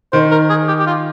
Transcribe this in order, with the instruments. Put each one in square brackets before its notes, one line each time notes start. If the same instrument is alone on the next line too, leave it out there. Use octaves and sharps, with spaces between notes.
[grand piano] D#3 [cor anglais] C5
[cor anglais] A#4
G#4
G4
G4
F4